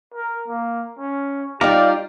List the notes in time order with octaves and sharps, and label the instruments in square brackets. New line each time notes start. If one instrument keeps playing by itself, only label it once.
[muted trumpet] A#4
A#3
C#4
[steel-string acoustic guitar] G3 D#4 F4 [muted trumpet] G4 [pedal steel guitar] D5 F5 A#5